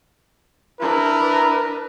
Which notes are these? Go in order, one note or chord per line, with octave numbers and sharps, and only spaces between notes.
D4 E4 A#4 B4